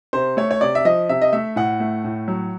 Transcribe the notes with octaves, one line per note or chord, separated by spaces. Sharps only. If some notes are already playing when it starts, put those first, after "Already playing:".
C3 C5
A3 C#5
C#5
C3 D5
E5
F3 D#5
C3 E5
D#5
A3 E5
A2 F#5
A3
A2
F#3